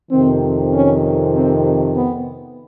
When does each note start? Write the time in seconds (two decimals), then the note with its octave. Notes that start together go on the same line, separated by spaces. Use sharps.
0.11 F2 C3 D#3 C4
0.73 C#4
1.35 C4
1.97 B3